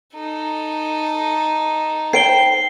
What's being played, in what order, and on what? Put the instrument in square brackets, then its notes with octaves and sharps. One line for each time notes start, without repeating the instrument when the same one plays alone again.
[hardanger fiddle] D#4 A4
[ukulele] C5 G5 [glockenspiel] C7 D7 G7